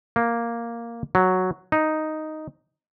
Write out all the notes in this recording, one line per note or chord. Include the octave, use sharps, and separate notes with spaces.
A#3
F#3
D#4